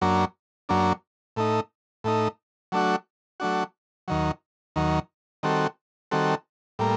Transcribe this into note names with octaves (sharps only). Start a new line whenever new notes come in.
F#2 F#3 A#3 D4
F#2 F#3 A#3 D4
A2 A3 D#4
A2 A3 D#4
F#3 A3 D4 F#4
F#3 A3 D4 F#4
D#2 D#3 F#3
D#2 D#3 F#3
D#3 G3 C4 F#4 A4
D#3 G3 C4 F#4 A4
A2 G3 A#3